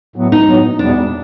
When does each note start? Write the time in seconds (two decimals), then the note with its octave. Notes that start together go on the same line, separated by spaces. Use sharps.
0.16 A2 F#3 B3
0.32 D#4
0.47 A2 F#3 B3
0.79 E2 B2 G3 B3 D4